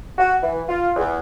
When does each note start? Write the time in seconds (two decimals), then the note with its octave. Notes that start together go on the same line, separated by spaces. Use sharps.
0.18 F#4
0.43 E3
0.69 F4
0.97 E2